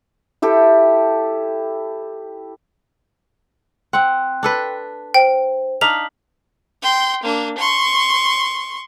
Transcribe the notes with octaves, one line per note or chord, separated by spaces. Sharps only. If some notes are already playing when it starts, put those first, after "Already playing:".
E4 G4 A4 G5
C4 F#5 G5 C6 F#6
D4 A4 B4
C5 G5
D4 D#4 F5 F6 B6 F7 F#7
G5 C6
A#3 D4
C6 C#6